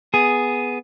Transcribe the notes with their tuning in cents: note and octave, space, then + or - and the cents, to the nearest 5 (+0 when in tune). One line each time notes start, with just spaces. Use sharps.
B3 +0 G#4 +0